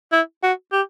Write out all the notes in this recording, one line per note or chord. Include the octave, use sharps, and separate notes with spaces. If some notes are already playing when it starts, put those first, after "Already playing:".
E4
F#4
G4